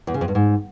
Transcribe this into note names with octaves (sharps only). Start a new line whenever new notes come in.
E2
C#3
F2
G2
G#2